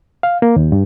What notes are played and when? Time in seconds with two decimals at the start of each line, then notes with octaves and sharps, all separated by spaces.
0.23 F5
0.42 A#3
0.56 D#2
0.72 G2